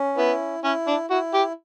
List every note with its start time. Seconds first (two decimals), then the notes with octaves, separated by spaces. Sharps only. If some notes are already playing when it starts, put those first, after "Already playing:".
Already playing: C#4
0.17 B3 E4
0.64 C#4 E4
0.87 D4
1.10 E4 F#4
1.34 G4